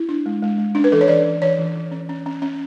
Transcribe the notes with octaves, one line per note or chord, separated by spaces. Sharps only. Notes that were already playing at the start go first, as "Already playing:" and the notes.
Already playing: E4
D4
G#3
G#3
G#3
C#4 D4
B4
E3 A4
C#5
E3 D5
E3
E3 C#5
E3
E3
C#4
C#4
C#4
C#4